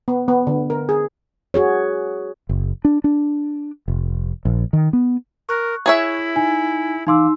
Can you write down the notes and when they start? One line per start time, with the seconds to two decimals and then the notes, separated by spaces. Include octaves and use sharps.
0.08 B3
0.28 B3
0.47 D3
0.70 A#4
0.89 G#4
1.54 F#4 G#4 C#5
2.49 F#1
2.85 D4
3.04 D4
3.88 F1
4.45 A#1
4.73 D#3
4.93 B3
5.49 A#4 C#6 F#6
5.86 E4 G#4 C#5 E5
6.36 D#4 G#5
7.07 E3 D#4 F5 C6 D6 E6